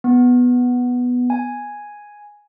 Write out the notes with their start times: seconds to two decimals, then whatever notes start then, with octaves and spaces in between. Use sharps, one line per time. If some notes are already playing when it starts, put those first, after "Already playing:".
0.04 B3
1.30 G#5